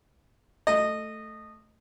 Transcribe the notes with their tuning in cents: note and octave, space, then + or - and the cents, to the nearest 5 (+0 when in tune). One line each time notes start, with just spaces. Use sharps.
A3 +0 D#5 -15